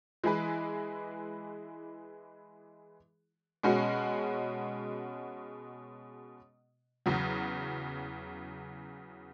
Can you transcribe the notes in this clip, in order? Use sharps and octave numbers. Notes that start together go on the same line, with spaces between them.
E3 G#3 E4 G#4 B4
B2 G#3 C#4 F#4
E2 C#3 F#3